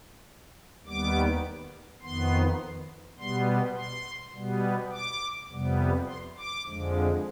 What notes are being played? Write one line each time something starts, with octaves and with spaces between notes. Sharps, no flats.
D#2 D#3 G3 B3 D6
F2 D#3 B3 C6
B2 G3 B3 C6
C6
B2 G3 B3
D6
F2 C3 G3 B3
C6
D6
F2 D3 F3 G#3